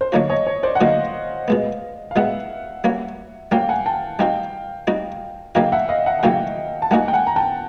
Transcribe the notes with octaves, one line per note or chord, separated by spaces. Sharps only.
C5
D3 F#3 A#3 D#4 F#4 C#5
C#5 D#5
C#5
C5 D5
F#5
D3 F#3 A#3 D#4 F#4 D#5 F5
B2 G#3 B3
F5
B2 G#3 B3 E5 F#5
G3 A#3 C#4 F#4
G3 A#3 C#4 F#4 F5 G5
F#5 G#5
G5 A5
G3 C4 D#4 F#4 F5 G5
G3 C4 D#4 F#4
C#3 F#3 A#3 D#4 F#4 F5 G5
E5 F#5
D#5 F5
E5 F#5
F#5
C#3 F#3 A#3 D#4 F#4 F5 G5
A5
G3 A#3 D#4 F#4 F#5 G#5
G5
F#5 G#5
A#5
G5 A5